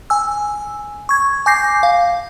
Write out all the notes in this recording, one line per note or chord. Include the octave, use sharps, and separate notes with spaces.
G#5 E6
C#6 G#6
G#5 D6 G6 A#6 C7
F5